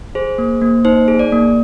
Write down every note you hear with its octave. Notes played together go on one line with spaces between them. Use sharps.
G#4 C5
A#3
A#3
D#4 C5
G#4
D5
A#3